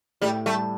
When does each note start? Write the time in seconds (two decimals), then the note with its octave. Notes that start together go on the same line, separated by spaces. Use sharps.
0.22 A2 G3
0.46 G3 A3